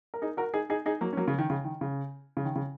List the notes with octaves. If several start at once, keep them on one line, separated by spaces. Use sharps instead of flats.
A#4
D#4 G#4
F#4 A#4
D#4 G#4
D#4 G#4
D#4 G#4
F#3 A#3
C#4
F#3 A#3
C#3
D#3
C#3
D#3
C#3
C#3
D#3
C#3